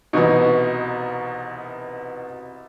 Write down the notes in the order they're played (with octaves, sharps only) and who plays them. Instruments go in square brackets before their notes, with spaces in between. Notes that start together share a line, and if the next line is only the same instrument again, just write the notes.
[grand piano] C2 D#4 C#6 [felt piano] B2 E3